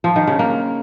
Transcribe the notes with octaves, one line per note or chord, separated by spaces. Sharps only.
F3
D#3
C#3
A#3